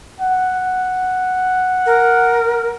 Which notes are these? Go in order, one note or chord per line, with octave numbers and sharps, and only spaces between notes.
F#5
A#4